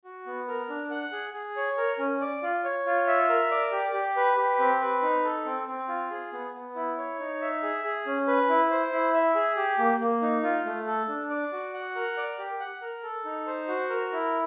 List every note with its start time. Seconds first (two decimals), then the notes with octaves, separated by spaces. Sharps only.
0.04 F#4
0.26 B3
0.48 A#4
0.69 D4
0.91 F#5
1.12 G#4
1.34 G#4
1.56 C#5
1.78 A#4
1.99 C#4
2.21 D5
2.42 F4
2.64 C#5
2.86 F4
3.07 E5
3.29 A#4
3.51 D5
3.72 G4
3.93 G4
4.16 B4
4.37 G4
4.59 C4
4.81 B4
5.02 D#4
5.24 A4
5.46 C4
5.68 C4
5.88 F4
6.11 G#4
6.33 B3
6.54 B3
6.75 E4
6.97 C#5
7.19 D#4
7.41 E5
7.63 G#4
7.84 G#4
8.06 C#4
8.27 B4
8.49 E4
8.71 C5
8.92 E4
9.14 E5
9.35 G#4
9.57 G4
9.78 A#3
10.00 A#3
10.22 D#4
10.43 F4
10.66 A3
10.87 A4
11.08 D4
11.30 D5
11.52 F#4
11.74 F#5
11.95 A#4
12.17 D5
12.38 G4
12.60 F#5
12.82 A#4
13.03 A4
13.25 D#4
13.46 C5
13.68 F#4
13.90 A#4
14.12 E4